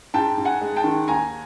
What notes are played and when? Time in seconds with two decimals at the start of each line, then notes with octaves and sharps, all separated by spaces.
0.14 G#2 G5 A5
0.38 G#2
0.45 F#5 G#5
0.61 G#3
0.76 G5 A5
0.84 D#3
1.08 D#2 G#5 A#5